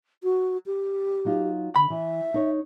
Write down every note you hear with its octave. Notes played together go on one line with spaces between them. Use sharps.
F#4
G4
F#3 D#4 F4
D3 B5
E3 E5
D#4 C#5